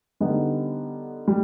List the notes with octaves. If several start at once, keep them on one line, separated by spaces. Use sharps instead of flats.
D3 G3 B3 D#4
G3